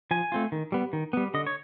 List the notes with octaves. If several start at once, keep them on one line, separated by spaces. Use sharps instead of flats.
F3 G#5
A3 C4 F4
D#3
G3 B3
D#3
G3 B3
D3 D#5
C#5